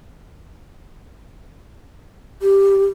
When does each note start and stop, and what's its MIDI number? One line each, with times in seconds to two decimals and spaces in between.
2.42 2.85 67